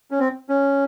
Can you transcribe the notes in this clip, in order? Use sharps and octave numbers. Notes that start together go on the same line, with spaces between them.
C#4
C4
C#4